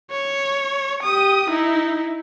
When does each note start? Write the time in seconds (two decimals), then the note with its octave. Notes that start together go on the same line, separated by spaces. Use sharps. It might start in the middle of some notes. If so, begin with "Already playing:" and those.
0.11 C#5
1.03 G4 D#6
1.49 D#4 E4